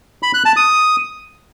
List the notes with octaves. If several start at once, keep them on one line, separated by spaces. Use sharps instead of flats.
B5
F#6
A5
D#6